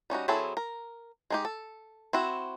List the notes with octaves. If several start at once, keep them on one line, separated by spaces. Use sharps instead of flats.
G3 C#4 D#4 F#4
F#3 C4 E4 G#4 A4
A#4
G#3 D#4 G4
A4
C4 E4 F#4